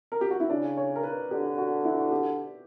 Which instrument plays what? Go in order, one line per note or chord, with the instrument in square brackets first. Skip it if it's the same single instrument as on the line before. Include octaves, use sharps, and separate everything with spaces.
[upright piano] A#4
G4
F#4
E4
[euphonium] C#3 [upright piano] D4
[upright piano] C#5
A#4
B4
[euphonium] D3 [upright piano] G4
[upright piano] F#4
E4
F#4
G4